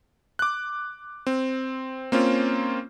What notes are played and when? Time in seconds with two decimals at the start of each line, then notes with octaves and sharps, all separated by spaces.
0.39 D6 F#6
1.27 C4
2.12 A#3 C4 C#4 F4